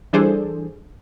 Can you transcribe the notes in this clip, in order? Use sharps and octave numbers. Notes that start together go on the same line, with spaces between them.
E3 G3 D4 G#4 A4 C5